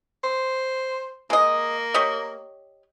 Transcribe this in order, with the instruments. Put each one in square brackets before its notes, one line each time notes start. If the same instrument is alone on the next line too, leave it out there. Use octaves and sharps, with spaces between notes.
[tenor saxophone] C5
[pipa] G#3 D#5 [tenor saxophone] A#3
[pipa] G4 C#5 D#5